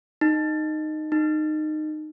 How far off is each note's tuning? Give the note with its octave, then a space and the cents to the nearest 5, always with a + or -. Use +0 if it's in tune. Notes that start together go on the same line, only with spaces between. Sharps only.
D#4 -15
D#4 -20